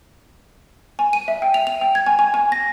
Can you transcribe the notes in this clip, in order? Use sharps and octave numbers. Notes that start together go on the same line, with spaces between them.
G#5
D#7
E5
G5
F7
F7
G5
G#6
G#5
G#5
G#5
A#6